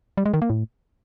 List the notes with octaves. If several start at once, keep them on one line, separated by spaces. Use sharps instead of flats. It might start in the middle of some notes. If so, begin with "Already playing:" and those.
G3
G#3
D#3
A#3
A2